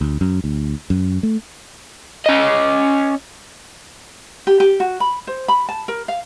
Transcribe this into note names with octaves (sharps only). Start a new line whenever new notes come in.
D2
F#2
D2
F#2
A3
C#4 D#5
G4
G4
F#4
B5
C5
B5
A5
A#4
F5